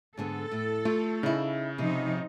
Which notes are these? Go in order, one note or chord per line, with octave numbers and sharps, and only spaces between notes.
G#2 D3 B3 A4
A2
A3 F4
C#3 D#4 E4
C3 F3 C4 D#4